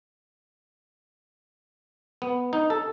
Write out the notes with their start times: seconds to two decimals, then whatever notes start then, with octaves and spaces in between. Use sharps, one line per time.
2.22 B3
2.53 D#4
2.70 A4